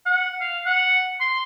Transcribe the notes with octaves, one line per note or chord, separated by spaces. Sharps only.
F#5
F5
F#5
C6